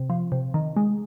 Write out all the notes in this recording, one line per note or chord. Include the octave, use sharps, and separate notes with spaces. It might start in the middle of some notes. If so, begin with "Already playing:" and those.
Already playing: C3
F3
C3
D#3
G#3